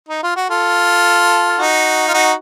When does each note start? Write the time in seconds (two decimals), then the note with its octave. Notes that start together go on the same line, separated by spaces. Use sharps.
0.09 D#4
0.23 F4
0.36 F#4
0.50 F4 A4
1.59 D#4 F#4
2.08 F4
2.14 D#4 F#4